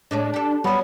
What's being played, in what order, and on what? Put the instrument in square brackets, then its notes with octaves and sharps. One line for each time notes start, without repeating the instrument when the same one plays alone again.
[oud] A2 G#3 C#4 [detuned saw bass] D4
[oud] G4 A4
[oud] F#3 C#4 [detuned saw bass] G3 [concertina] B3